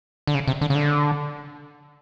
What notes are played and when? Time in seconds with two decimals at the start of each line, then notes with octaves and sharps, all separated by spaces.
0.27 D3
0.35 C#3
0.48 C3
0.61 D3
0.70 C#3
0.75 D3